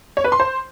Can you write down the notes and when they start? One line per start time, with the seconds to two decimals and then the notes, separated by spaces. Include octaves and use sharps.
0.17 C#5
0.24 B4
0.32 C6
0.40 C5